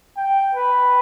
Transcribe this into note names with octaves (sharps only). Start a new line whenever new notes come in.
G5
B4